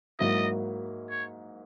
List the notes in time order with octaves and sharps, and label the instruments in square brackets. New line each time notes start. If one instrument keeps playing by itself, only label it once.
[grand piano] G#2 F#3 A#3 E4 [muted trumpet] D#5
[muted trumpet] C#5